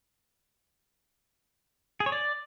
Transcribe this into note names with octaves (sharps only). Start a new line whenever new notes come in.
G#4
C#5
D5